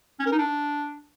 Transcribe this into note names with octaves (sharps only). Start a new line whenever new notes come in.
C#4
A#4
D#4
D4